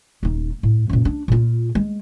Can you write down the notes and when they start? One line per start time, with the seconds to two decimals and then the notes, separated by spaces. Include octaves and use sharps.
0.23 D#1 D#4
0.63 A2
0.89 F#2 A#2
1.05 D4
1.28 A#2 F4
1.75 G#3